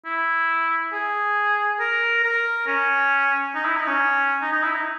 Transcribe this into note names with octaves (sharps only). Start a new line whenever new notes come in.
E4
G#4
A#4
A#4
C#4
D#4
E4
D#4
C#4
D#4
D#4
E4
D#4